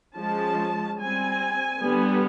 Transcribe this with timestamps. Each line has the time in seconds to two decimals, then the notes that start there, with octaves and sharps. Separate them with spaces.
0.17 F3 G#3 C#4 A5
0.99 G3 C4 G#5
1.80 D3 G3 B3